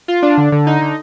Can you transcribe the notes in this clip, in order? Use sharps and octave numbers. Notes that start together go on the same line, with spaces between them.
F4
D4
D3
D3
D#4
D3